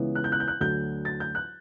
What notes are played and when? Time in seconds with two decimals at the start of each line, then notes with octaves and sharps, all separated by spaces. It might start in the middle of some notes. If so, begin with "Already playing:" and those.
Already playing: C#2 C#3 E3 B3
0.15 F#6
0.24 G6
0.32 F#6
0.40 G6
0.48 F#6
0.60 D2 D3 F#3 G6
1.05 A6
1.20 G6
1.35 F#6